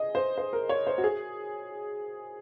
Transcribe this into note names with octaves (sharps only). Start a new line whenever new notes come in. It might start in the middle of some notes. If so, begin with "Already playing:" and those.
Already playing: G#4 D#5
C5
C5
A#4
C#5
C5
F#4
G#4